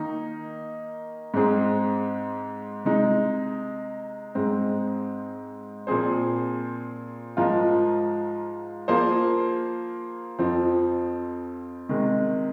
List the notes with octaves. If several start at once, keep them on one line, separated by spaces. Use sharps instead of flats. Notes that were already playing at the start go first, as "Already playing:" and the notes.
Already playing: D#3 A#3 D#4
G#2 G#3 C4 G#4
C3 G#3 D#4
G#2 G#3 C4
A#2 F3 C4 G#4 C5
G#2 F3 G#3 F4 A#4
F3 A#3 F4 G#4 C5
F2 F3 C4
C3 D#3 G#3